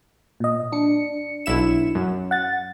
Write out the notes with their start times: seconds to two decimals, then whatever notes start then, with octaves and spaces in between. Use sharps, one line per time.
0.40 A#2 D#5
0.72 D4 C#7
1.46 B1 E4 E7
1.95 F#2
2.31 F#5 A6